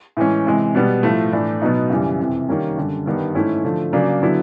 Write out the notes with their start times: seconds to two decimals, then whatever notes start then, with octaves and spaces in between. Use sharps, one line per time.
0.17 A2 E3 G#3 C#4
0.46 C3 E3 G#3
0.75 B2 G3 B3
1.03 A2 F3 A3
1.32 A2 E3 A3 D4
1.62 B2 F#3 B3 D#4
1.90 F#2 C#3 E3 G3
2.19 F2 C3 E3
2.49 D#3 G3 A#3 C#4
2.77 F#2 D3 G3
3.06 G2 D#3 G3 B3
3.35 G#2 E3 A3 C#4 E4
3.64 D3 F3 A3
3.93 C#3 F#3 A#3 D4
4.22 D3 F#3 B3 E4